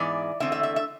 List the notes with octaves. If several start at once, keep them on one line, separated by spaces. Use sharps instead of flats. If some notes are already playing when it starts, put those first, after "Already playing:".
Already playing: G#2 E3 B3 D5
E2 D3 A3 C4 E5
E5
E5
E5